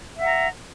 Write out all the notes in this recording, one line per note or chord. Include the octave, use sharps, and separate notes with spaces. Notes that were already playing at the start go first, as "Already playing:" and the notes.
E5 F#5 A#5